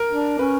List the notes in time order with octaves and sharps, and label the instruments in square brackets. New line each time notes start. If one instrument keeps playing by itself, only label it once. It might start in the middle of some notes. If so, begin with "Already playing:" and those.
Already playing: [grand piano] A#4
[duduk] D4
[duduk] C#4 [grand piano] B4